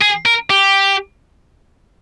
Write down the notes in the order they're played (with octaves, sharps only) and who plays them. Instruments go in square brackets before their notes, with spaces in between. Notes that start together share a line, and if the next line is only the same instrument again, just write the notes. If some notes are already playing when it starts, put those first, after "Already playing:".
[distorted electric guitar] G#4
A#4
G4